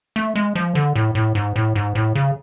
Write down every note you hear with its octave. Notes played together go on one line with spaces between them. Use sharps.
A3
G#3
F3
D3
A2
A2
G#2
A2
G#2
A2
C#3